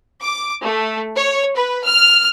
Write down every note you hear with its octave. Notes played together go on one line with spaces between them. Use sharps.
D6
A3
C#5
B4
F6